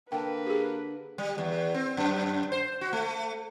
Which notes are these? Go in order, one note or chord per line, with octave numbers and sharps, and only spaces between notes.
D3 A#3 B4 G5 A5
G4 G#4
G3
E2
C4
F#2
C5
F#4
A3